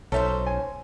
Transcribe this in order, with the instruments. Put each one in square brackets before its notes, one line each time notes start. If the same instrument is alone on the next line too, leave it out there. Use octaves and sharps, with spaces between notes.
[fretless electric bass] B1 [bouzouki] C#4 D#4 C5 [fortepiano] A4 E5
[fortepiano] G#5